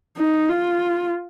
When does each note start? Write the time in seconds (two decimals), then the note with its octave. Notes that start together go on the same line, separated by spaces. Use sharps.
0.17 D#4
0.49 F4